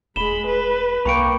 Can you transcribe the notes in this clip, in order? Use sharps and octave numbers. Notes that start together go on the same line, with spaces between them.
E1 G#3 B5 E7 G7
B4
C2 A#3 D4 G5 B5 C#6 C#7 D7